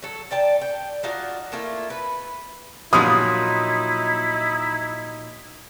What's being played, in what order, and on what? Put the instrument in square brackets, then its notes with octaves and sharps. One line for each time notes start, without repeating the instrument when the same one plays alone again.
[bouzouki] F#3 A4
D5 G5 A5 A#5
G5
D4 D#4 F4 F#4
A3 A#3 E4 F4
B4
[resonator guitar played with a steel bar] A#2 F3 F#3 [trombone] D#4 [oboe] E4 [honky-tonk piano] D#6